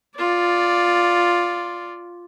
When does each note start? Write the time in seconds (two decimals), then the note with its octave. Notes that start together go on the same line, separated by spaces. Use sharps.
0.17 F4 D5